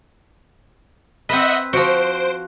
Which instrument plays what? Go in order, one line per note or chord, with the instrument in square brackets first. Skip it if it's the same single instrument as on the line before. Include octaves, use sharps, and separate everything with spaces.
[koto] C4 B4 [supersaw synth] D#5 E5 F#5
[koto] F3 F#4 [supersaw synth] C5 D7